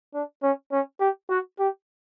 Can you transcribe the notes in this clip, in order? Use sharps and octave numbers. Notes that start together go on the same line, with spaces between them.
D4
C#4
C#4
G4
F#4
G4